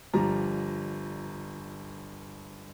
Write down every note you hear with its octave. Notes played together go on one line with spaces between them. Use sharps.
G1 F3 G3 A#5